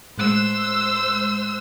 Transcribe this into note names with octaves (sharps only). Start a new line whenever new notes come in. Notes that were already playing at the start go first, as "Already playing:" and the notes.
A2 G#3 C5 E6 F#6